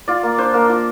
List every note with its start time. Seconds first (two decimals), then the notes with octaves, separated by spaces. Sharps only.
0.08 F4 D5
0.23 A#3
0.38 D4 C5
0.54 A#3 A#4
0.70 F4